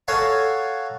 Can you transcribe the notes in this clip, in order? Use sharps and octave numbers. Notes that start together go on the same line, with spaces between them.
A4 C#5 F5 F#5 G#5 A#5